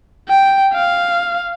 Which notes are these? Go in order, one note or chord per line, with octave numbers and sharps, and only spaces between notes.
G5
F5